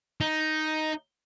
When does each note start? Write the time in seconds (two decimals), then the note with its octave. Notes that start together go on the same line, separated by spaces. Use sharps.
0.21 D#4